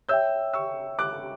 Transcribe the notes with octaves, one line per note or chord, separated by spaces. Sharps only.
C#5 E5 G5 E6 G6
C#6 E6
D6 F#6